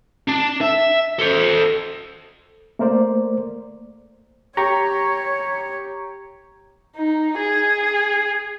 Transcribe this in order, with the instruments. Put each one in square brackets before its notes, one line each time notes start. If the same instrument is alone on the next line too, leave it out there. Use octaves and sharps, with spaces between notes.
[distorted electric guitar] D4 A5
E5
A4 C5
[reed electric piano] A3 A#3 A#4 C5 D5
[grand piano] G4 [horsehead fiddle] C#5 [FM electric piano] A#5 C#6
[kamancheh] D#4
G#4